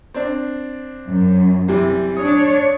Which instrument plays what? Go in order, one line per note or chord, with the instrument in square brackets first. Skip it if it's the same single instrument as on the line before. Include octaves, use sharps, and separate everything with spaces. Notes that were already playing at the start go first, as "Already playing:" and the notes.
[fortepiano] C4 D4
[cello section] F#2
[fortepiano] C3 E3 G3
[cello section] D4 C#5 [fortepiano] D#6